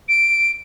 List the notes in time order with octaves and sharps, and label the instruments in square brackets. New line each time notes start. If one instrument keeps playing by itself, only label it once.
[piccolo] D7